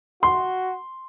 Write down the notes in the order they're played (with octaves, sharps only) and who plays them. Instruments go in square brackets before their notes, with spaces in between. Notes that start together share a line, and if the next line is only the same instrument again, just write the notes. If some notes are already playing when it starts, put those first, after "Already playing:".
[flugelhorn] F#4 [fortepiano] C6